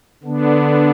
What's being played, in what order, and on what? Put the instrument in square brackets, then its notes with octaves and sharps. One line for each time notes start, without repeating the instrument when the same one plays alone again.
[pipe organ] D3 B3 D4